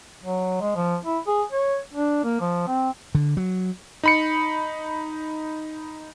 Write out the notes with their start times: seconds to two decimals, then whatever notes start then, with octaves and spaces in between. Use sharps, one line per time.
0.24 F#3
0.61 G#3
0.76 F3
1.05 E4
1.27 G#4
1.52 C#5
1.94 D4
2.24 A#3
2.41 F3
2.67 C4
3.15 D3
3.37 F#3
4.03 D#4 B5 C#7